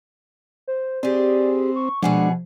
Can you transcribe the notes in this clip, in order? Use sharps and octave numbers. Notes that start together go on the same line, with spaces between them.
C5
C4 G4 G#4 D5
C#6
B2 F3 G#3 D4 G#4 F#5